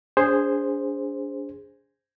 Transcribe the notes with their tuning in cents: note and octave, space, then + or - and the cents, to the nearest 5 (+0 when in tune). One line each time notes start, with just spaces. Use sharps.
D4 -40 G#4 -10 C5 +0